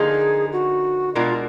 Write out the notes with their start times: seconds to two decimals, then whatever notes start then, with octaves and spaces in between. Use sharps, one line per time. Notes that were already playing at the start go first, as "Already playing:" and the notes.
Already playing: D3 F3 A#3 D#4 G#4
0.52 F#4
1.15 B2 G#3 D4 F4 F#4 A#4